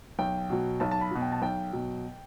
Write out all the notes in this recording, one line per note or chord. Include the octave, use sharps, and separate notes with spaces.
B1 G5
B2 F#3
B1 A5
A5
B5
B2 F#3
G5
A5
B1 G5
B2 F#3